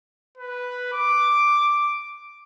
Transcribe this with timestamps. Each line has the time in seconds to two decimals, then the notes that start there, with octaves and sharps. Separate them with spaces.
0.38 B4
0.93 D6